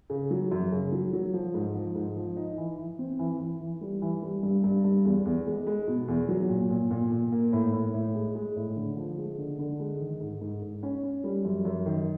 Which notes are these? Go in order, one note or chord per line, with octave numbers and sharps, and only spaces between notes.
C#3
F#3
F#2
C#3
F#3
F#3
F3
G#2
F3
G#2
F3
D#4
E3
E3
C4
E3
E3
E3
G3
E3
G3
G2
G2
G2
E2
E2
G#3
G#3
B2
E2
F#3
A#2
A#2
A#2
A#2
A#3
A2
A2
A2
G#3
G#3
A2
D3
F3
G#3
D3
D3
G#3
D#3
G#2
G#2
G#2
C#4
C#4
G3
F#2
F#2
D#3